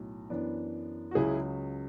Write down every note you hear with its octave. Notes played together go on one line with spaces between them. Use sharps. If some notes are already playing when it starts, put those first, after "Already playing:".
Already playing: B1 A2 F#3
F#2 E3 B3 D4
F#4
C#2 C#3 F#3 E4 G#4